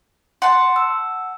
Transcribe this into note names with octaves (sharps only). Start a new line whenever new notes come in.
F#5 A5 C6
E6